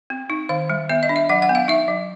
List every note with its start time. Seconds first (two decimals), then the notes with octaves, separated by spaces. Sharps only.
0.10 C4
0.30 D#4
0.49 D#3 F5
0.70 G3
0.89 B3 E5
1.03 D#5
1.09 D4
1.16 E5
1.29 F#3 F#5
1.42 F#5
1.49 B3
1.55 F5
1.68 D#4 E5
1.88 F#3